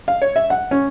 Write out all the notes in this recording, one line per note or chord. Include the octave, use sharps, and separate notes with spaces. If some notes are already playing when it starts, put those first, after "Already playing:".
F5
C#5
E5
F#5
C#4